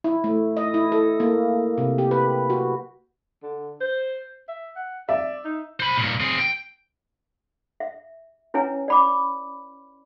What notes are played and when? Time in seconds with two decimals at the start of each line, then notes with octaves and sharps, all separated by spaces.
0.04 E4
0.24 A3
0.57 D#5
0.74 E4
0.92 A4
1.20 A#3
1.78 C3
1.98 G4
2.11 B4
2.50 F#4
3.43 D3
3.81 C5
4.49 E5
4.76 F#5
5.09 D5 E5
5.45 D#4
5.80 C5 B5
5.97 G2 A#2
6.21 C4 G#4
6.40 G5
7.80 E5
8.54 C#4 E4 B4 C#5 G#5 A#5
8.88 D5 B5 D6